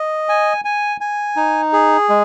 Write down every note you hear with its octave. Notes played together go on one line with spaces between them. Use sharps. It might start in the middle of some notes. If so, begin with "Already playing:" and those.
Already playing: D#5
G#5
G#5
G#5
D#4
G#4
G#3